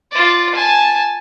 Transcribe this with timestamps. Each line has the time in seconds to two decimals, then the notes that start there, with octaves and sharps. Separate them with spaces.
0.12 F4 D5
0.55 G#5 A5